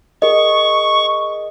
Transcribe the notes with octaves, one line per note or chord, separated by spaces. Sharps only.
G#4 A#4 D#5 C#6